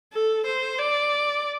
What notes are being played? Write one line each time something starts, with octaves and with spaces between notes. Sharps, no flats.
A4
C5
D5